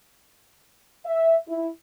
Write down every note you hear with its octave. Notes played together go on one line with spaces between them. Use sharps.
E5
E4